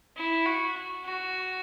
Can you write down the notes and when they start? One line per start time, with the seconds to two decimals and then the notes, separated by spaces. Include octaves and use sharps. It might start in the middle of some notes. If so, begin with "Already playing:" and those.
0.17 E4
0.46 F#4
1.05 F#4